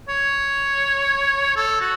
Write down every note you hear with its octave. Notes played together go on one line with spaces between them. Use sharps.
C#5
A4
F#4